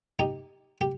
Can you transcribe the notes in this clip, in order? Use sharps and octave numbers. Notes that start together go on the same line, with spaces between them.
D#4 G4
G4